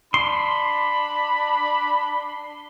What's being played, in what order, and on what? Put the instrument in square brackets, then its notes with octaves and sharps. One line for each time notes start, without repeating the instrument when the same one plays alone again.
[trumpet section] D4 B5 [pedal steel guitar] C6